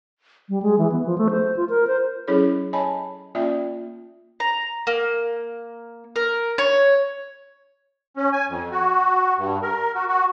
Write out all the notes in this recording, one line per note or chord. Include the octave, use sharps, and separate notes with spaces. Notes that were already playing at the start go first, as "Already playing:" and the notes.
G3
G#3
E3
B3
F3
A3
C5
F4
A#4
C5
F#3 C#4 E4 G#4 A4 C#5
C#5 D#5 G#5 A5 B5
A#3 C#4 F4 D5 E5 G5
A#5
A#3
A#4
C#5
C#4
G#5
F2
F#4
G2
A#4
F#4
F#4